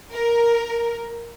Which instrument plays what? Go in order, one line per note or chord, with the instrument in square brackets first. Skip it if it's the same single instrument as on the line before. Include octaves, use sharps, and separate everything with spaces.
[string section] A#4